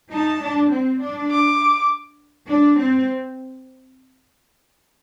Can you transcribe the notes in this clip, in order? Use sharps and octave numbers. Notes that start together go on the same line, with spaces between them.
D#4 A5
D4
C4
D4
D6
D4
C4